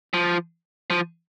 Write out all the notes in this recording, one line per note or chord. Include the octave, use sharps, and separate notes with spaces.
F3
F3